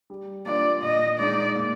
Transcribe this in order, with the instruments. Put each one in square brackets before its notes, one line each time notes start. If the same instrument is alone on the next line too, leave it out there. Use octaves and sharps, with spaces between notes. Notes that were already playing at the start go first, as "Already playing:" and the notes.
[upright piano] G3
[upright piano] A#3 D4 F4 [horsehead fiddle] D5
[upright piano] A#2 [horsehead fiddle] D#5
[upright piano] G#3 D#4 [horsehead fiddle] D5
[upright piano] A#2